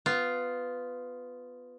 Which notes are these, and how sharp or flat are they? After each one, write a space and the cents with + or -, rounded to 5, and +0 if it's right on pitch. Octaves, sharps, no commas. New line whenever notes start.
B3 +15 F4 +0